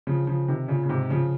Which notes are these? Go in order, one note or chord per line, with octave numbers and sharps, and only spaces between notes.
C#3 F3
C#3 F3
C3 D#3
A#2 C#3
C#3
G#2 C3
C#3 F3